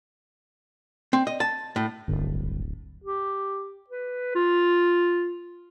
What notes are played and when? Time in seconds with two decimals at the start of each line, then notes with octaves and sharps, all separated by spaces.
1.13 C4
1.27 D#5
1.40 A5
1.76 A2
2.08 D1 G1
3.03 G4
3.90 B4
4.35 F4